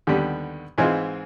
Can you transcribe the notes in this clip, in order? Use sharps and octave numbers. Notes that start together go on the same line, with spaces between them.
D#2 D3 G3 B3
G#2 E3 G#3 C4 F4